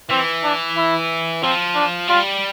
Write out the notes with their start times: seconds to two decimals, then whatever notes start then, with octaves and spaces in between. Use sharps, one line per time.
0.10 E3 C4
0.43 D4
0.76 E4
1.42 F3 C4
1.75 D4
2.08 G3 F4